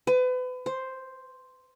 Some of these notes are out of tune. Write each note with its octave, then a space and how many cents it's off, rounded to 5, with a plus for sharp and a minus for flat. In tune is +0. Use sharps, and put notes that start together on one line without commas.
B4 +35
C5 +0